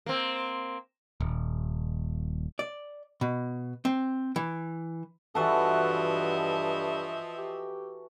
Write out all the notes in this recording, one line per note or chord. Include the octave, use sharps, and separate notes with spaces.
A#3 C4
D#1
D5
B2
C4
E3
G2 E3 F3 F#4 A4 D#5 E5
G4